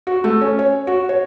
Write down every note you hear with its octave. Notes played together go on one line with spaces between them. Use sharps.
F#4
A3
C#4
C#5
F#4
C#5